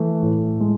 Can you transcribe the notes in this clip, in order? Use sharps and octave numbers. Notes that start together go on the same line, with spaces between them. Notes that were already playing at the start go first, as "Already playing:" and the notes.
Already playing: E3 A3
A2
G#3